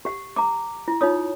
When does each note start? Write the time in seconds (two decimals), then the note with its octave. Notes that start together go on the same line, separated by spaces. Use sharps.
0.05 G4 F#5
0.36 A#5 D6
0.88 E4
1.01 D#4 F4 C#5 D#6